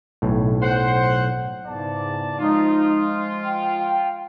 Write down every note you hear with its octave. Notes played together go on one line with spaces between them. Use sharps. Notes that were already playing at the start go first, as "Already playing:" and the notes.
B1 A2
C5 F#5
E2 G#2 C#3 D5 A5
F3 G#3 D#4 F4
G5